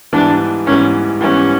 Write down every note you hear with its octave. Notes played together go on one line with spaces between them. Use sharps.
G#2 E3 G3 B3 D4
G#2 E3 G3 B3 C#4
G#2 E3 G3 B3 C#4